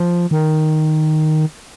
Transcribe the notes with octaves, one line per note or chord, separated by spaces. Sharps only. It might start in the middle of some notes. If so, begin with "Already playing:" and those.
Already playing: F3
D#3